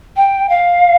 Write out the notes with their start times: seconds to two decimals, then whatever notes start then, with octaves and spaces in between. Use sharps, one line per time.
0.17 G5
0.49 F5